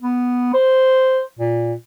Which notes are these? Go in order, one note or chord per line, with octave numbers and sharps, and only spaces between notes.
B3
C5
A#2